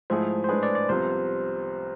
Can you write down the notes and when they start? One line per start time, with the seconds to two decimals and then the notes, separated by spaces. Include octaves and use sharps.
0.10 G#2 F3 A3 E4 G#4 C5
0.44 C5
0.49 A2 G#3 D4 G#4 B4
0.63 D5
0.75 D5
0.89 C2 C3 F3 B3 C5